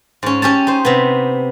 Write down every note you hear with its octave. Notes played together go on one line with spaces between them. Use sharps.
G#2 C#4
C#4 G4 C#5 A5
D#4 C5
C3 B3